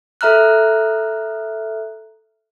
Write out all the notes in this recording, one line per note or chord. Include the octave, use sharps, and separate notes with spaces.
A4 E5 A#5 F6 F#6